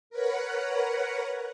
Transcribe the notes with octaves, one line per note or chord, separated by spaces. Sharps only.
A#4 B4 C#5 F#5